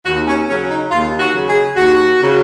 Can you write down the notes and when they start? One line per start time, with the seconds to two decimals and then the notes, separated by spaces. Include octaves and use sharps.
0.06 D#2 F#4
0.27 C#4
0.48 C#3 F#3 C#4
0.71 D#4
0.91 D#2 F4
1.20 F#4
1.34 C#3 F#3
1.48 G#4
1.76 D#2 F#4
2.19 C#3 F#3